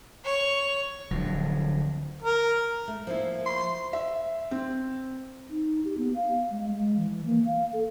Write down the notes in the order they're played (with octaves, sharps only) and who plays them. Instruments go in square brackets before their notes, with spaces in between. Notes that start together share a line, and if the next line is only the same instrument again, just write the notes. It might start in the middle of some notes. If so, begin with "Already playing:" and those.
[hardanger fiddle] C#5
[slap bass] D1 D3 F3 F#3
[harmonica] A#4
[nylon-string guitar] A3
F3 A#3 E4
[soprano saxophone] C6
[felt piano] E5
C4
[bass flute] D#4
G4
B3
F5
G#3
G#3
E3
A#3
F5
A4